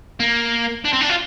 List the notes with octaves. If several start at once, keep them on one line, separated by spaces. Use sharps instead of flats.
A#3
D4
C4
D4
F4